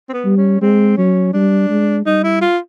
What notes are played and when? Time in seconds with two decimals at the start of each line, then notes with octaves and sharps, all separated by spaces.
0.09 C4
0.13 B3
0.25 G3
0.37 C#4
0.61 G#3 C4
0.97 F#3 C#4
1.33 G3 D4
1.70 G#3
2.06 G3 D#4
2.24 E4
2.42 F4